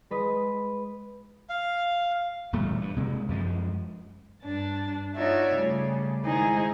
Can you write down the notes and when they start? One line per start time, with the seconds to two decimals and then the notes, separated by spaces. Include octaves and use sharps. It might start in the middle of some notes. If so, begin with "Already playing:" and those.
0.11 G#3 B4 D#5
1.49 F5
2.53 E1 A#2 G3 A3
2.81 G2
2.96 C3 G#3 A#3
3.29 F#2 F3 G#3
4.43 G2 D4 A6
5.15 D#4 F4 F#4 C#5 D5 E5
5.54 C#3 G3 A3
6.23 D#3 G#3 D#4 E4 G#4 C5